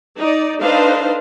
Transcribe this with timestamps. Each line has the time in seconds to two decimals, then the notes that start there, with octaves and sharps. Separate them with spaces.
0.19 D#4 D5
0.61 D4 D#4 A4 B4 C5 F5